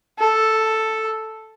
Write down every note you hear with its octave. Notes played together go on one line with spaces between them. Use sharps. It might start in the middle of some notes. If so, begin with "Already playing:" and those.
A4